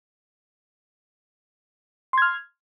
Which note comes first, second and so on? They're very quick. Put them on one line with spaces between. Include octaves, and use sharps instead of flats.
C6 G#6 F6